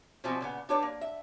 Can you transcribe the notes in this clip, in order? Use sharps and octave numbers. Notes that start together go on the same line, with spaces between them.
B2 E3 F3 G3 C4 F#4
A#2 C#3 B3
D4 G4 B4 C#5 D5
A#3
E5